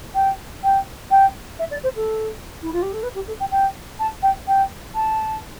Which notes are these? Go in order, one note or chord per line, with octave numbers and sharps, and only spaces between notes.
G5
G5
G5
E5
D5
C5
A4
E4
F4
G4
A4
B4
G4
A4
G5
G5
A5
G5
G5
A5